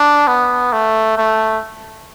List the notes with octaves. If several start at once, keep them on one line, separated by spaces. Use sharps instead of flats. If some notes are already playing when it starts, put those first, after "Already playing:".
Already playing: D4
B3
A3
A3